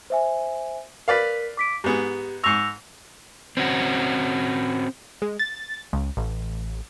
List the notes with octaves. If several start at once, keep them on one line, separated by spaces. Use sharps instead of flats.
C5 E5 G#5
A#4 B4 D5 F5 B6
D6 B6 D7
G#2 B3 G4 G#4
G#2 C#6 E6 A#6 F7
C4 C#4 F#4
G#3
A6
C#2
A1